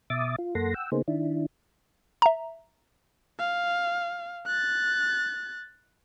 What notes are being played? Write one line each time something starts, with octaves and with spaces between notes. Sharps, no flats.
B2 E5 D6 D#6 A6
F4
F#2 A#3 A4 F#5 C6 A#6
F#5 G5 E6
C#3 A#3 B3 D#4 G#4 C5
D#3 D4 E4
E5 A#5
F5
F#6 A6